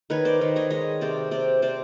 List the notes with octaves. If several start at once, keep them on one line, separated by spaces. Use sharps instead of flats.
D#3 B4 C#5
C5 D5
D#3
C#5 D#5
G#3 C#5 D#5
C3 C5 D5
C3 C5 D5
C3 C5 D5